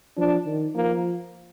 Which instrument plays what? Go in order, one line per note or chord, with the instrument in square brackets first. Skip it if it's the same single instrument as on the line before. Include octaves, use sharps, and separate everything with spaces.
[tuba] F3 [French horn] D4
[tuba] D#3
[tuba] F3 [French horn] A#3